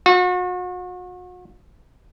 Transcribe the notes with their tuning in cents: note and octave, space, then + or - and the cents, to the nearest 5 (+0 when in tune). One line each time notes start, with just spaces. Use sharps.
F#4 -40